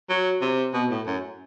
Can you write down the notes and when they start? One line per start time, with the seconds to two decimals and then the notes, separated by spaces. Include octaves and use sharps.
0.10 F#3
0.41 C3
0.74 B2
0.90 A2
1.06 F#2